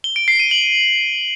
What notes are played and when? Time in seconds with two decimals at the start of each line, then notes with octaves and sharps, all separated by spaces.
0.04 G7
0.16 D7
0.28 C7
0.40 D#7
0.51 F#7